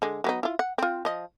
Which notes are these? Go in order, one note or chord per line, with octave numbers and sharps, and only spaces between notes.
D3 G#3
F#3 B3 D#4
E4 F4
F#5
C4 F4
F3 D#5